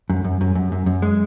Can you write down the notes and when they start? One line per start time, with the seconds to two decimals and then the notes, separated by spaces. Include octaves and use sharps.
0.10 F#2
0.24 F#2
0.41 F#2
0.55 F#2
0.72 F#2
0.86 F#2
1.02 G#3